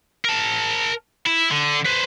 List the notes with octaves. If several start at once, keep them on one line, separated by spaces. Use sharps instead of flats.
A#4 A5
E4
D3
B4 C5